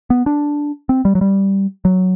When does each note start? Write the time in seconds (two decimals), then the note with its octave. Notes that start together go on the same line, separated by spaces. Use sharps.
0.10 B3
0.26 D4
0.89 C4
1.05 G3
1.15 F#3
1.21 G3
1.85 F#3